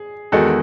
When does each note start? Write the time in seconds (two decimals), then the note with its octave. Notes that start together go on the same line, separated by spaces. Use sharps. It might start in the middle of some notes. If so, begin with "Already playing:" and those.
Already playing: G#4
0.32 E2 D#3 G#3 F#4 A4